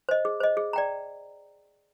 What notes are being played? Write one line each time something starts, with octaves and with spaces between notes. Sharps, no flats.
C5 D#5
G#4
C5 D#5
G#4
D5 G5 A#5